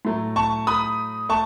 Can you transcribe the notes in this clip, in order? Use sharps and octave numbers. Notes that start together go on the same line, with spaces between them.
A2 F#3 A3
A5 C#6
B5 D#6
A3 A5 C#6